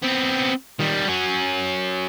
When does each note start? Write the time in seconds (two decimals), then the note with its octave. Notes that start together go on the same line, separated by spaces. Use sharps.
0.03 B3 C4
0.79 D#3 G3
1.07 F#3 C#4